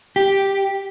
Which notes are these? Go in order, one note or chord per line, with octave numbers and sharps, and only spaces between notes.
G4